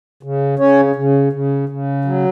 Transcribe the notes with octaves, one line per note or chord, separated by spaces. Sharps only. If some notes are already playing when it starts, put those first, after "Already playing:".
C#3
C#3 C#4 C#5
C#3
C#3
C#3
F#3